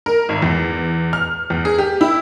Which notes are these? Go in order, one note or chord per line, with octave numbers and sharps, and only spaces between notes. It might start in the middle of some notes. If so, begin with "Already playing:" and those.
A#4
G#1
E2
F6
E2
G#4
G4
E4